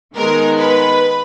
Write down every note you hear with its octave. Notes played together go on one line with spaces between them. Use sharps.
D#3 G#3 B3 A#4
B4